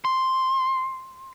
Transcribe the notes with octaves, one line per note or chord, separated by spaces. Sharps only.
C6